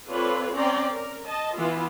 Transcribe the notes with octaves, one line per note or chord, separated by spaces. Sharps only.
C4 F4 A4 B4 C#5 D5
C4 C#4 D5 G5 A#5 C6
A#4
D#5 A5
E3 B3 E4 F4